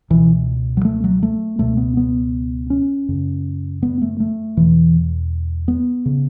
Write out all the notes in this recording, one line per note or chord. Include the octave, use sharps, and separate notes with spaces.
C#2 B2 E3
F#3
A3
F#3
A3
C#2 B2 A3
B3
B3
C#4
F#2 C#3
B3
A3
A3
E2 B2 E3
B3
C#3